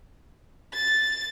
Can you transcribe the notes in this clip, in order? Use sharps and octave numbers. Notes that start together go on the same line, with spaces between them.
A6